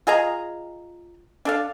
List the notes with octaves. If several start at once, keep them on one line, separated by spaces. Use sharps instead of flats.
F4 G#4 D#5 A#5
D4 A4 F5